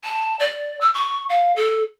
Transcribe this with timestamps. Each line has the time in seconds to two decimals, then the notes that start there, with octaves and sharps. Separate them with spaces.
0.04 A5
0.39 D5
0.81 E6
0.94 C#6
1.29 F5
1.56 A4